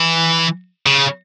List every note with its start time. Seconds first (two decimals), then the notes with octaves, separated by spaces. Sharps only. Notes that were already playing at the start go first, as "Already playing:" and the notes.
Already playing: E3
0.86 C#3